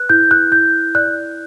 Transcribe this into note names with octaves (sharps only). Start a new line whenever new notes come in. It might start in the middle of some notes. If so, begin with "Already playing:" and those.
Already playing: B4 F#6
E4 G6
F#6
E4 G6
D5 F#6